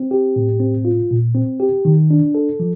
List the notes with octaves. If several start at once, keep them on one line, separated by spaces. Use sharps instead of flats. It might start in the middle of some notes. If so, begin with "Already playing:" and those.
Already playing: C4
G4
A2
C4
F4
A#2
C4
G4
D#3
D4
A4
F3